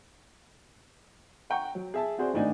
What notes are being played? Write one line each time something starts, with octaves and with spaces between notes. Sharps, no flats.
F#5 G5 A#5 C#6
F#3
G#4 E5 A5
C4 F#4 G#4 C5 D5
G#1 A2 D4 D#4 G#5